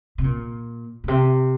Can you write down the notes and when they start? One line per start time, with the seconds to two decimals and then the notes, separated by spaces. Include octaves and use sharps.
0.18 C3
0.24 A#2
1.04 A#2
1.08 C3